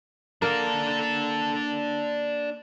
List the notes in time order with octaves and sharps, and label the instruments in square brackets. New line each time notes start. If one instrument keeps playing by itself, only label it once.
[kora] A#3 A#4 [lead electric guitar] D4 A4